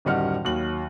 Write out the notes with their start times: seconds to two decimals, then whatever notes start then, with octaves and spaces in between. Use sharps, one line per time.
0.05 D1 F#2 D#3 G3 F#5 F6
0.45 D#2 F#3 F#7